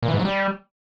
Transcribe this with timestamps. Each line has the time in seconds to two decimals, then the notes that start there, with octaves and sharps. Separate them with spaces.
0.03 A#2
0.08 E3
0.14 G#2
0.19 F#3
0.25 G3